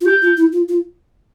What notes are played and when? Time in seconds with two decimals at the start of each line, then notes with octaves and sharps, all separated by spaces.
0.01 F4
0.05 G4 G6
0.22 F4
0.37 E4
0.52 F4
0.69 F4